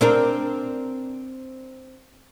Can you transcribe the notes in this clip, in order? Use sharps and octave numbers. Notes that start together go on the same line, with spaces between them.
C4 D4 A#4